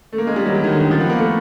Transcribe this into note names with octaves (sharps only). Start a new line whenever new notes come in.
A3
A#3
G#3
G3
F#3
E3
D#3
D3
D#3
F3
B3
A#3
A3